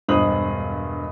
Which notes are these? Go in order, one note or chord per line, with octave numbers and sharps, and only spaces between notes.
E1 G2 C5 D#5 D#6 F#7